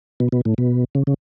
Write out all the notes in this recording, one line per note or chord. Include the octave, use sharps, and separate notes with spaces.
B2
B2
A2
B2
C#3
C#3